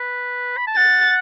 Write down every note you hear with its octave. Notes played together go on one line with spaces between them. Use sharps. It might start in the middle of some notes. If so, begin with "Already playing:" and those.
Already playing: B4
B5
A5
F#5 A6